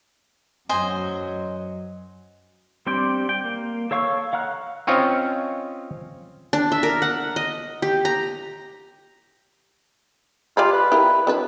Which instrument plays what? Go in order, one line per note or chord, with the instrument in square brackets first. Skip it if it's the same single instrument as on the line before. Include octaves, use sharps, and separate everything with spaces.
[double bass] F#2 F#3 [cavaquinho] C5 D#5 G#5
[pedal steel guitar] G3 C4 D4 D5 G5
G5
A#3
A4 C#5 F5 C#6 E6
F5 F#5 A#5 F6 F#6
[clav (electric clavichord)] C4 C#4 F4 C#5 D#5 G#5
[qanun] D4
E5
A#4
F#5
D#5
G4
A#5
[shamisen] G3 D5 B5 [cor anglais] F4
[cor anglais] B4
[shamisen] E4 G4 A#4
F#3 D4 B4